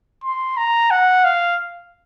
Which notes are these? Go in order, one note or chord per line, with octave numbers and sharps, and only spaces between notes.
C6
A#5
F#5
F5